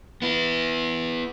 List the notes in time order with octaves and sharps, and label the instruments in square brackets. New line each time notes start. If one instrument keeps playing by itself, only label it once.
[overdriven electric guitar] B3 E4